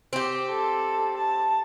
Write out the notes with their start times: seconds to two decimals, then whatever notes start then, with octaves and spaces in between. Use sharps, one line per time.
0.13 C4 G4
0.50 A4
1.17 A5